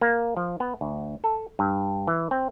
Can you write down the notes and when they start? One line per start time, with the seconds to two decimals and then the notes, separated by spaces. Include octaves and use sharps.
0.01 A#3
0.37 F3
0.60 B3
0.81 D2
1.24 A4
1.59 G2
2.07 E3
2.31 C4